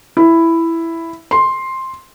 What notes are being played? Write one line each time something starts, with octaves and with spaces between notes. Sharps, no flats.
E4
C6